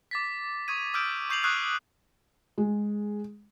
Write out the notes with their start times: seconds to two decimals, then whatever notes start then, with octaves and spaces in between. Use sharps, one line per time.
0.11 D6 A6 B6
0.68 C#6 D#6 G#6 D#7
0.94 D6 E6 F6 G6 D7
1.30 C#6 G6 C7 F7 F#7
1.43 C#6 D#6 F6 F#6 G#6 C7
2.58 G#3